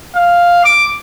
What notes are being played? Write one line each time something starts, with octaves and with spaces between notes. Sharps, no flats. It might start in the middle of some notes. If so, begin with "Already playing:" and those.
F5
D6